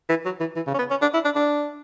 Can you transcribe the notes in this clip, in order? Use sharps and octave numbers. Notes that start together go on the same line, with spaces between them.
E3
F#3
E3
E3
C#3
C#4
B3
C#4
D4
E4
D4
D4